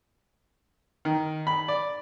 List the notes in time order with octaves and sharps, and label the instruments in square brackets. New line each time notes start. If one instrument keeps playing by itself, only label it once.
[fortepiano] D#3
B5
D5